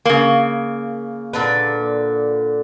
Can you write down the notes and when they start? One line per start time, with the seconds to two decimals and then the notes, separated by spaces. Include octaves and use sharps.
0.05 C#3 A#3
1.33 A#2 D3 B4